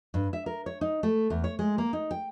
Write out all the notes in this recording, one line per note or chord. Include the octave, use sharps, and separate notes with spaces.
G2
E5
A#4
C#5
D#4
A3
E2
C#5
G#3
A#3
D#4
G5